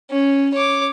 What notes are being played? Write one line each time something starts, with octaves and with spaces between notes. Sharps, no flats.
C#4
C#5 D6